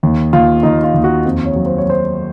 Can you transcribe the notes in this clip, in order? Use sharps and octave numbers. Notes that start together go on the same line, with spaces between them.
D#2
D#2 F4
D#2 D#4
F4
D#2
F#4
F2
C#5
F#3
C5
C#5
F#3 C5